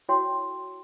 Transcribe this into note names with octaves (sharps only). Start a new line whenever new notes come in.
E4 F#4 A4 C#5 G5 C6